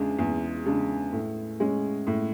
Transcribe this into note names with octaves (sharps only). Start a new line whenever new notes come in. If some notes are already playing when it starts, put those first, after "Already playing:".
Already playing: E2 C#3 G#3 D4
E2
C#3 G#3 D4
A2
G#3 C#4
A2